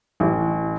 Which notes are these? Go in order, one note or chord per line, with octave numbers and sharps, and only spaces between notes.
A1